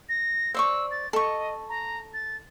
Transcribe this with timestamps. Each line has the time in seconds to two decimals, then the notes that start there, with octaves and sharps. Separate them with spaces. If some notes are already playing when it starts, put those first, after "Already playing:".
0.09 A#6
0.54 C5 D5 C#6 E6
0.91 A6
1.13 A4 D#5 C#6
1.69 A#5
2.14 A6